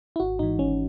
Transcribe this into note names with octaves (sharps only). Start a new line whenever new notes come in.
E4
G#1 F#4
G#2 E3 D#4
G#1 C#4